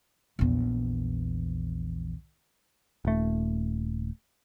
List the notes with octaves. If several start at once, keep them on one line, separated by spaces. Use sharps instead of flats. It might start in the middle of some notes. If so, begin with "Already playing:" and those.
A#1 E2
D#1 A3